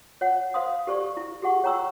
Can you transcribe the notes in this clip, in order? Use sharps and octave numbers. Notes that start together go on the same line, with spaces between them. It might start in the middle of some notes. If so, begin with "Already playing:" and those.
C#5 F#5
C5 F5 C6 D#6
G4 A4 C5 D5 C#6
E4
G4 G#4 F#5 C#6
C#5 G5 A#5 C#6 E6